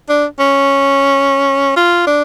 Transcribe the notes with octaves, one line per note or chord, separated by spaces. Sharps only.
D4
C#4
F4
D4